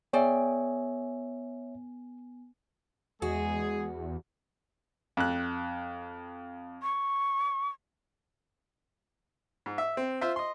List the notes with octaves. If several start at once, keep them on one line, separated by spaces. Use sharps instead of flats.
B3 G#4 C#5 D5 E5 G5 G#5
E2 G#3 F#4 G#4
F2 F#6
C#6
G#2
E5
C4
F4 C5 E5
D#5 C6